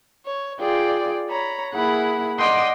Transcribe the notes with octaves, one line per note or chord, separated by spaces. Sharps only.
C#5
F4 G#4 D5 G5
C#5 A#5 B5
A#3 E4 G#4 F#5 B5
D5 D#5 F#5 G5 C6 D#6